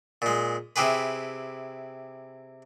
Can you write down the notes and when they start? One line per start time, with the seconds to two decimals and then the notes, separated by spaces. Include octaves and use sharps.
0.22 A#2 G#3
0.76 C3 E4 G4 G#4 B4